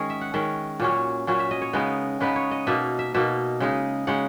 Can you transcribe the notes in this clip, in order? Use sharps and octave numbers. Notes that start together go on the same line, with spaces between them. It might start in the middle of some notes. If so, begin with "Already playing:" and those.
Already playing: D#3 G#3 C#4 G#4
E5
F#5
D#3 G#3 C#4 E5
A#2 F#3 C#4
A#2 F#3 C#4
E5
D#5
C#5
C#3 G#3 B3 D#4
C#3 G#3 B3 D#4 B4
C#5
D#5
B2 A#3 D#4 E5
E5
B2 A#3 D#4 E5
C#3 G#3 D#4
C#3 G#3 D#4 F#5